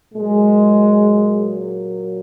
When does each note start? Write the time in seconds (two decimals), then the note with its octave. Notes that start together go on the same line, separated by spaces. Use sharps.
0.14 A#2 F#3 G#3